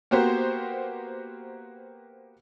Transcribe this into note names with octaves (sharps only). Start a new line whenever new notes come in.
A#3 B3 F#4 G4 A#4 C5